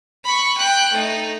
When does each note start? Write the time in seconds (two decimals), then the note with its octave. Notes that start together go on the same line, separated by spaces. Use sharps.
0.24 B5 C#6
0.57 G5 F#6
0.92 A3 D#4